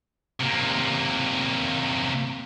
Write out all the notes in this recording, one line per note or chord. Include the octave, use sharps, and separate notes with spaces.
C3 A#3